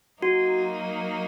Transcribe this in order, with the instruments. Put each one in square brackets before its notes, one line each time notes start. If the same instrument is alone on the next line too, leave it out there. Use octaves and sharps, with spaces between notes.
[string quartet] F#3 A#3 D#4 [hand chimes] F#4